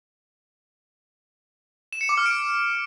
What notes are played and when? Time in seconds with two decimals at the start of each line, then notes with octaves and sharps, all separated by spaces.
1.93 E7
2.01 C#7
2.09 D6
2.17 F6
2.26 D7